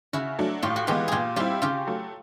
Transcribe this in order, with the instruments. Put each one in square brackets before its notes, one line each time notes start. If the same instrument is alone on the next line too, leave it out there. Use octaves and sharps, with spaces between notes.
[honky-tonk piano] C#3 [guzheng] E4 F#4
[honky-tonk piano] F#3 A3 D4
[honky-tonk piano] A2 [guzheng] F4 G4
[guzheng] F#4
[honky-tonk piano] E3 G#3 B3 [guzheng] F4 G4
[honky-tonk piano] A#2 [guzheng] F4 G4 G#4
[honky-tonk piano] G3 C4 E4 [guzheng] F4 G4
[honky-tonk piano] C#3 [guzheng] F4 G4
[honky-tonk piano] F#3 A3